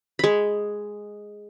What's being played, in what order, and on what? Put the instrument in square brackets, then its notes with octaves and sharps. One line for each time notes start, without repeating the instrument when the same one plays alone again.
[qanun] G#3 B5